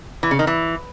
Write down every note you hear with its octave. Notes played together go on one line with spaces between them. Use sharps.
E3
C#3
D#3
E3